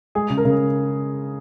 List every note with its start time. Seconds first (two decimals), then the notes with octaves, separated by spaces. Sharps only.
0.15 G#3 G#4
0.30 C#3
0.37 A#4
0.45 C#3